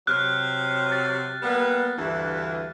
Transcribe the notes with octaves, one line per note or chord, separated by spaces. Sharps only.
C3 F#3 F6 F#6
A6
G3 A#3 B3
D2 G2 E3